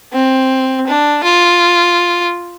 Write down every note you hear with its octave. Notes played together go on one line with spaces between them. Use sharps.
C4
D4
F4